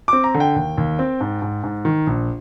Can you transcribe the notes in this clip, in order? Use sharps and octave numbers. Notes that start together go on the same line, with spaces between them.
C4 D6
A#5
D3
G5
D#2
D#2
C4
G#2
G#2
G#2
D#3
A#1